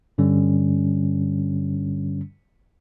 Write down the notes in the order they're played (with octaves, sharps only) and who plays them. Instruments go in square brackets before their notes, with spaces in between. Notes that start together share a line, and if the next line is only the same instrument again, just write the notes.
[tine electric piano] G2 D3 G3 C#4